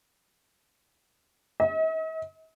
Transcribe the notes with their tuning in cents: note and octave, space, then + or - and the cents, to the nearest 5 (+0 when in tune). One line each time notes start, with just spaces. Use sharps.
D#5 +45